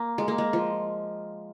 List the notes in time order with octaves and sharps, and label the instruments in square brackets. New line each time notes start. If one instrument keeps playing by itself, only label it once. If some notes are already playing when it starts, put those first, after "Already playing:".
Already playing: [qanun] A#3
G#3
A#3
G#3
F3